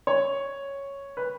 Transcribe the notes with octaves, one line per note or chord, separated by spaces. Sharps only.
C#5
B4